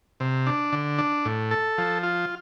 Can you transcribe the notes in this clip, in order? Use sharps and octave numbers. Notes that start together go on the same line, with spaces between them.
C3
D4
D3
D4
A2
A4
F3
F4